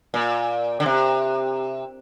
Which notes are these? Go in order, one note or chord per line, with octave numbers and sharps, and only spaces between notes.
A#2
D3
C3